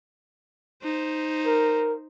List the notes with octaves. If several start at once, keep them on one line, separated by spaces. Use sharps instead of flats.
D#4 C5
A#4